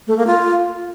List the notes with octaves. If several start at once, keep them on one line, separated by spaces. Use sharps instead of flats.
A3
A#3
F4